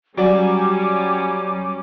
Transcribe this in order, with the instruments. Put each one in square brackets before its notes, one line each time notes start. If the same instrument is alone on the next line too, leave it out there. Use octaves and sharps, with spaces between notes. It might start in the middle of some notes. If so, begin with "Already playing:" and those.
[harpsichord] F#3 [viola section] G3 C#4 [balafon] F#4 D5 [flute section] G#5 D6